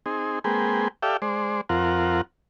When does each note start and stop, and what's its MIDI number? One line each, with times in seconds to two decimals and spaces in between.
0.06 0.39 60
0.06 0.39 63
0.06 0.39 68
0.44 0.88 56
0.44 0.88 58
0.44 0.88 60
0.44 0.88 68
0.44 0.88 71
0.44 0.88 79
1.03 1.17 67
1.03 1.17 69
1.03 1.17 74
1.03 1.17 76
1.03 1.17 77
1.03 1.17 79
1.22 1.61 56
1.22 1.61 72
1.22 1.61 74
1.69 2.21 41
1.69 2.21 60
1.69 2.21 65
1.69 2.21 70
1.69 2.21 78